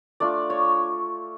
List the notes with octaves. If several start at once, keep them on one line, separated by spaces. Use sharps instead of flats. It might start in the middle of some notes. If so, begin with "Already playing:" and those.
A3 D4 F4 D5
C#5